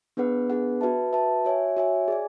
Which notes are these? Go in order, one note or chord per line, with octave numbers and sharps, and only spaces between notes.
B3 D4 G#4 B4 F#5
B3 D4 G#4 B4 F#5
F#4 B4 E5 A5
F#4 B4 E5 A5
F#4 C#5 E5 G#5
F#4 C#5 E5 G#5
G#4 D5 G#5